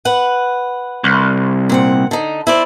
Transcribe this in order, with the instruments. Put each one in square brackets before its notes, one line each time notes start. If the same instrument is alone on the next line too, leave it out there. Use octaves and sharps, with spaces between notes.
[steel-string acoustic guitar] B4 F#5
[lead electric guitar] C2
[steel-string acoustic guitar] A#2 C4 F#5
D3 D#4
E4 C5 D5